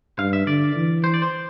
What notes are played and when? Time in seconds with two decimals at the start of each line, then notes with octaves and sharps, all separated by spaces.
0.19 G2 F5
0.33 E5
0.47 D3 D5
0.76 E3
1.04 C5
1.14 D5
1.22 C5